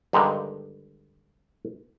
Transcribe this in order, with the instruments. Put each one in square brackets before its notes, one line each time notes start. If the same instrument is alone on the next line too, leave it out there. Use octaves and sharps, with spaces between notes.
[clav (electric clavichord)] G2 D3 D#3 G#3 D#4